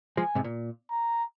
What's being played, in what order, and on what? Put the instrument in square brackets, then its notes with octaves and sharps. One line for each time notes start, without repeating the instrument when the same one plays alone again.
[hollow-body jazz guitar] F3 G#3 [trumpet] G#5
[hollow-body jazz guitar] G#2 C3
A#2
[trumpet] A#5